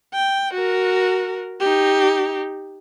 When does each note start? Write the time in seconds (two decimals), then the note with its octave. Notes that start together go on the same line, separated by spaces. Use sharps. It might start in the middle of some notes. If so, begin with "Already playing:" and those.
0.14 G5
0.54 F#4 A#4
1.60 D#4 G4